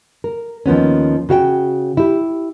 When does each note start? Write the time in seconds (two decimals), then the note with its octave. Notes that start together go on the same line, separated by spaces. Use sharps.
0.24 A#4
0.66 D#2 F3 B3 C#4
1.29 C#3 F#4 F5 G5
1.97 E4 G4